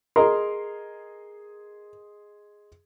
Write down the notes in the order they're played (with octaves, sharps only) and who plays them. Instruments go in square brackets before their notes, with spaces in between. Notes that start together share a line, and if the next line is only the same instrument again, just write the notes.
[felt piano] G#4 D#5 C6 [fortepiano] A#4